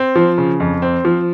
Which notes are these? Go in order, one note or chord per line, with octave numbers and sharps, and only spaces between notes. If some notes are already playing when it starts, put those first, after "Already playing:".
Already playing: C4
F3
C#3
F2
C4
F3